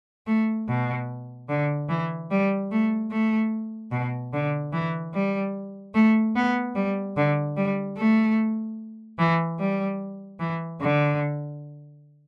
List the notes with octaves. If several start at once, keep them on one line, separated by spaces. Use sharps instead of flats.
A3
B2
D3
E3
G3
A3
A3
B2
D3
E3
G3
A3
B3
G3
D3
G3
A3
E3
G3
E3
D3